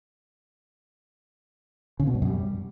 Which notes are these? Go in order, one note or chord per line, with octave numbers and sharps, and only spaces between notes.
C#3
B2
G2
F#2
G3